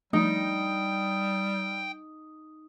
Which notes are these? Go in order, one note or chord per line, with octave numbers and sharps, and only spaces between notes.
F3 G3 A3 D#4 G5